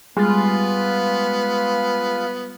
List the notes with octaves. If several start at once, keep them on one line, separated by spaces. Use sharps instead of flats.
G3 G#3 B3 F4 B4